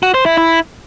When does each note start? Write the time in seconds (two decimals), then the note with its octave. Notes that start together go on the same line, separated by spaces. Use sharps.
0.03 F#4
0.14 C5
0.26 E4
0.38 E4